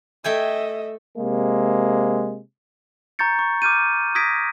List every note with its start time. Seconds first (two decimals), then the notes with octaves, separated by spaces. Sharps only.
0.24 A3 D#5 E5 G5 G#5
1.18 C3 G#3 A#3
3.19 A#5 C#6 G6 A6 C#7
3.39 C#6
3.62 D6 F6 G6 D#7
4.15 D#6 G#6 A#6 B6 D7